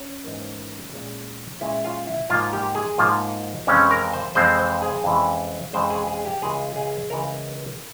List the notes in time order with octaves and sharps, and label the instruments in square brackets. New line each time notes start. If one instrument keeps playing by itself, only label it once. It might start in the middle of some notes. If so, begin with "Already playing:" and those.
Already playing: [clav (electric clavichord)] C#4
G#2 E3 A#3
A#2 G#3 C#4
A#2 G#3 C#4 E4
F4
E4
G#2 F3 A#3 F4
G4
G#4
G#2 F3 A#3 F4
F2 E3 G#3 C4 C#4
A#4
C5
F2 E3 G#3 C4 C5
C5
G#4
F2 E3 G#3 C#4
F2 E3 G#3 C#4 C5
G#4
G#4
G4
C#2 C#3 E3 G#3 G#4
G#4
C#2 C#3 E3 G#3 A#4